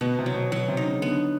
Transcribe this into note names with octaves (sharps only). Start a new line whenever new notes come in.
B2 B3
C3
F#3
B2
B2 F#3
C3
D#4
C#3
D3 B3